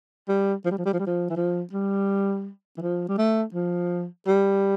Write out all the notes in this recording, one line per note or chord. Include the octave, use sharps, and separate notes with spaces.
G3
F3
G3
F3
G3
F3
G3
F3
E3
F3
G3
E3
F3
G3
A3
F3
G3